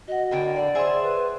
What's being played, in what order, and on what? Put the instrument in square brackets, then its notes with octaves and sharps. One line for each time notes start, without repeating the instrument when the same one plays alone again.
[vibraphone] F#4 F#5 [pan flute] D#5
[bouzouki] A2 D3 A#3 [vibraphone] D#5 [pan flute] G5
[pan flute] D5 [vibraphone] F#5
[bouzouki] G#4 E5 [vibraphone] C5 C6
[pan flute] B4